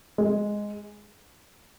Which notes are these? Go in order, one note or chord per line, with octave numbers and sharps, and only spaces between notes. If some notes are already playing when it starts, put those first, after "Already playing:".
G#3